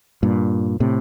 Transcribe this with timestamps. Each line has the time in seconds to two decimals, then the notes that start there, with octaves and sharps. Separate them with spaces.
0.23 G2 A#2
0.80 A2 C3